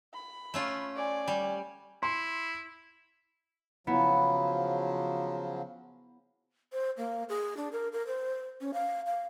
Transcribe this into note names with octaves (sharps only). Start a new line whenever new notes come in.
B5
A3 C#4 F4
D5 G#5
G3
E4 C6
C#3 F3 F#3 B3 E4
C5
A#3
G#4
D4
A#4
A#4
C5
C#4
F5
F5